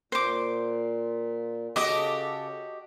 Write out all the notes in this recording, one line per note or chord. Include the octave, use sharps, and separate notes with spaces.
A#2 C5 D6
C#3 F#4 G4 A4 D#5 D6 D#6